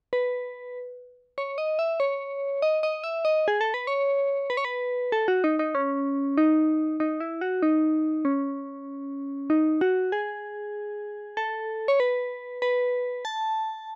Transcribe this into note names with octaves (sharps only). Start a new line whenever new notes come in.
B4
C#5
D#5
E5
C#5
D#5
D#5
E5
D#5
G#4
A4
B4
C#5
B4
C#5
B4
A4
F#4
D#4
D#4
C#4
D#4
D#4
E4
F#4
D#4
C#4
D#4
F#4
G#4
A4
C#5
B4
B4
A5